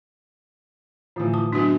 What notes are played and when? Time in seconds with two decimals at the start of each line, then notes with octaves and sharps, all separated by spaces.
1.16 A2 D3 E3 F3 A3
1.34 E4 A5 D#6
1.52 F#2 B2 D4 F#4